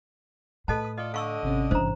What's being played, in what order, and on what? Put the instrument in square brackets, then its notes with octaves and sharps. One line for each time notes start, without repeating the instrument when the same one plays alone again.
[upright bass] A2 [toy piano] A4 D#5 A5 [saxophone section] B4
[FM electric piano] D#6
[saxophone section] F4 A4 D5 [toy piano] D#5
[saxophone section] D3 D#5 [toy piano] F5 C#6 E6
[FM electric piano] G#1 C3 C#4
[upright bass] G2 E3 [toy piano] C5 A#5